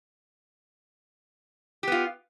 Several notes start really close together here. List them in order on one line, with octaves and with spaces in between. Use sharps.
G4 B3 F4